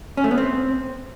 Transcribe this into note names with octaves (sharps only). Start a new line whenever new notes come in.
C#4
A3
B3
C4